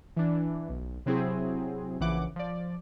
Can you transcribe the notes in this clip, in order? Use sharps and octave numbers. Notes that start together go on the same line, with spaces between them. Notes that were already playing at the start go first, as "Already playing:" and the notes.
E3 D4
B1
C3 F#3 C4 E4 G#4
A#1 C#3 E3 F#5 D6
F3 D5